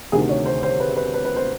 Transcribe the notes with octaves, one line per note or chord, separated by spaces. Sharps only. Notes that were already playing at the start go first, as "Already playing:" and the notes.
D2 C3 D#3 G#4
C#5
C5
C5
B4
B4
B4
B4
C5